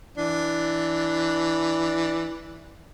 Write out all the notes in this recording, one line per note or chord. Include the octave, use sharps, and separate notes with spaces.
E3 D4